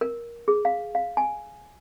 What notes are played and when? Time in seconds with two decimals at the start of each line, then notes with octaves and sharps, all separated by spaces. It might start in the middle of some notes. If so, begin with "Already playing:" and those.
0.01 A#4
0.48 G#4
0.65 F5
0.95 F5
1.17 G#5